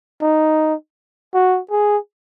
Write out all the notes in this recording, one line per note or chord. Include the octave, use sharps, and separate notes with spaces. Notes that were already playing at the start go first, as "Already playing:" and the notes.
D#4
F#4
G#4